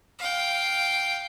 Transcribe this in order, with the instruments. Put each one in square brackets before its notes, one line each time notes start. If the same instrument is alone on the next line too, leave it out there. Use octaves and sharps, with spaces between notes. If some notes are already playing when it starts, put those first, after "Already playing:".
[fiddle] F5 G5